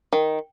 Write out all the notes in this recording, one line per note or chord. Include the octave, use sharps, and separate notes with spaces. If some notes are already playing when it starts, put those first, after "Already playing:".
D#3